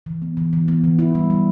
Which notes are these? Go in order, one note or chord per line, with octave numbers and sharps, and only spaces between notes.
E3
B3
E3
E3
B3
E3
E4
G3
G3